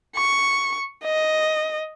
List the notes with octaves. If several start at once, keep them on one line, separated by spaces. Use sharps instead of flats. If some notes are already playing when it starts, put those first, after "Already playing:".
C#6
D#5